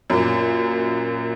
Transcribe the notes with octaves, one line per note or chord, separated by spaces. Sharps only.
F#2 A#2